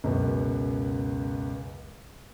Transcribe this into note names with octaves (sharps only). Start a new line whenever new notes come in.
C#2 F#2 B2